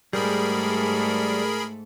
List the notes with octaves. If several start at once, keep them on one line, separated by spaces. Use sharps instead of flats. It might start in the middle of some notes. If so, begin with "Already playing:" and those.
G#2 G3 A3 G#4 A#4 B5